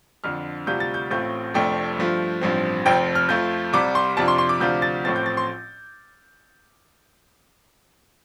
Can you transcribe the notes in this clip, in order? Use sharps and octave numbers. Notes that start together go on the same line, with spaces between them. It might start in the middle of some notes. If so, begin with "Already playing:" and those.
F2 D3 F3 F6
D2 C3 G3 F4 G6
A6
G6
A1 A2 A3 C4 F4 G6
F1 F2 F3 A3 D4 G5
G2 F3 A3 F4
A1 G2 F3 C4
F1 F2 F3 C4 G5
F6
F2 F3 A3 F4 G6
C2 C3 G3 D6
C6
F2 C3 F3 D4 F4 A5
C6
C6
D6
D2 C3 F3 D4 F4 G6
A6
A1 A2 F3 A3 C4 A6
G6
A6
C6